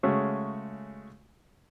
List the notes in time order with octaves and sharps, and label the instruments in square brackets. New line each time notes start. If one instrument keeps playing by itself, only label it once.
[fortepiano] C#3 G#3 A3 C#4 F#4